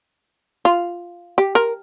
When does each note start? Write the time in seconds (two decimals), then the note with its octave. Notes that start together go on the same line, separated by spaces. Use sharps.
0.65 F4
1.38 G4
1.55 A#4